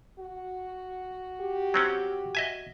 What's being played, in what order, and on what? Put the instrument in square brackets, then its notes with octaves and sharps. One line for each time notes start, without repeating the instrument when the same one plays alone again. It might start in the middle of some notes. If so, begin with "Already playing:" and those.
[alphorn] F#4
[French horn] G4
[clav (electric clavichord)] F#3 C4 C#4
D#5 E5 G#5